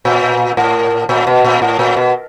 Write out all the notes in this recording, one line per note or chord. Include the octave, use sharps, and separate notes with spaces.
A#2
A2
A#2
B2
A#2
A2
A#2
B2